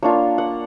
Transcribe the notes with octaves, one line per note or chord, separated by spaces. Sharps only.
A#3 D4 F4 C#5
F#5